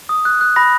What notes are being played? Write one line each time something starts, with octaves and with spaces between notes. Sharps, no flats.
D#6
F#6
F#6
B5 A#6